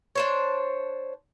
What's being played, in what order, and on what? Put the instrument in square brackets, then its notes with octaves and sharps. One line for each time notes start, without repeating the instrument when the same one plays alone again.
[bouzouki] D4 C5 C#5